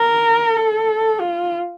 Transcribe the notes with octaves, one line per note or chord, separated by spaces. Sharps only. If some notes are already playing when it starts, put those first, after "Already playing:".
Already playing: A#4
A4
F4